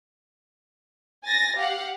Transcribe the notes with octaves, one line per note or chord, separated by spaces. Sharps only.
G#5 A6 A#6
G4 F5 F#5